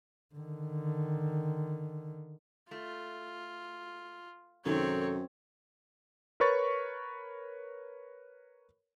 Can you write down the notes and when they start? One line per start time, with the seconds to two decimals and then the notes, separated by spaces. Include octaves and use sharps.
0.35 D3 D#3
2.71 A3 F4
4.65 F#2 C3 D#3 C4 G#4 A4 C#5
6.40 A#4 B4 C#5 B5 C#6 A6